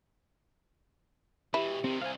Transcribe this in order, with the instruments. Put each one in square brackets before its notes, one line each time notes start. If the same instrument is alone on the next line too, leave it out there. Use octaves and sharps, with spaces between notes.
[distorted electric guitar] B2 E3 [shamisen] E4 [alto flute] G4
[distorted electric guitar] C3 D#3 [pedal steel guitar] C4
[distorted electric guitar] C2 [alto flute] C5 [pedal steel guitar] F5 G#5